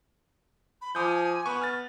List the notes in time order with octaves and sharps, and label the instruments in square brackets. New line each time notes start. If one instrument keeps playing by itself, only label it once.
[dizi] B5
[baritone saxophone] F3 [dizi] G#5 [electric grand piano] D6 D#6 G6
[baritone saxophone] B3 [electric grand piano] C#6
[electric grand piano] F6 A6